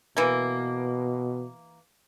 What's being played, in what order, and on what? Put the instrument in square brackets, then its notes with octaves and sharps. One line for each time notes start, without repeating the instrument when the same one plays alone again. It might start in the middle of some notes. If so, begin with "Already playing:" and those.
[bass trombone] B2 [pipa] E3 A#3